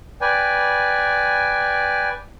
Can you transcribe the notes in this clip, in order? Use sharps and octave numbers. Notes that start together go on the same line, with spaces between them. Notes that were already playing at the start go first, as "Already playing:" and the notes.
B4 D5 G5 G#5